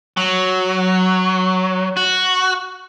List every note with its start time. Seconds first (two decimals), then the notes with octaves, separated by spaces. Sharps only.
0.17 F#3
1.97 F#4